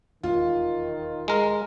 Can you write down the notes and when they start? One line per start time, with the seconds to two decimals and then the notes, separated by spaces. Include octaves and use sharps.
0.23 E1 D#2 D#3 F4
1.28 G#3 A#4